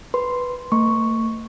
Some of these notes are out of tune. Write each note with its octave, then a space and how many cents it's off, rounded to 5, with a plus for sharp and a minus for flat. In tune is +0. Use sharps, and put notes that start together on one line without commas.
B4 +0 C6 +0
A3 +45 C#6 +0